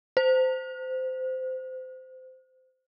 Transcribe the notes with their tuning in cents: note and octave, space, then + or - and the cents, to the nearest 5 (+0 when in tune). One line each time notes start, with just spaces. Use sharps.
C5 -20